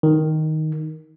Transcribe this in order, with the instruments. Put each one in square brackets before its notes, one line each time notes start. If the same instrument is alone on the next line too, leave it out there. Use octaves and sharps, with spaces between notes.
[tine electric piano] D#3